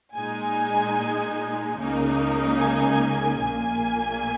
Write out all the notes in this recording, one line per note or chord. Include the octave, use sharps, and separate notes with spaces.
A#2 G#3 D#4 G#5
C#2 C#3 A#3 D#4
G#5
A#1 A#2 A#3 G#5